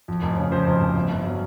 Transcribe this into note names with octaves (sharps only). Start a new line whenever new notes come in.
F2
F1
C#3
F2 C5
F1
F1
G1
G1
F#3